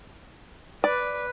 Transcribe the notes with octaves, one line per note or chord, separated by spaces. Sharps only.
B4 D5